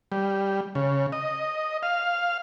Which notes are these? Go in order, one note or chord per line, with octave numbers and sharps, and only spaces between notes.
G3
C#3
D#5
F5